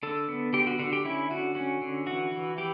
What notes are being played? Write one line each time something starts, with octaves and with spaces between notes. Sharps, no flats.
D3 A4
B3
D3 G4
F#4
D3 F#4
G4
C#4 E4
D3 F#4
C#4 F#4
D3
E3 F#4
E3
E3 G4